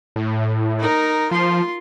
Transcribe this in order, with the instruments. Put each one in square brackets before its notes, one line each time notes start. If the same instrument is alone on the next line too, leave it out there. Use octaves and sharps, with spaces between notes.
[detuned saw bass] A2
[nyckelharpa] D#4 A#4
[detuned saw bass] F3 [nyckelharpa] F4 C6